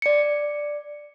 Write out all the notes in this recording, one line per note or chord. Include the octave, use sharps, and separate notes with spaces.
D5 C#7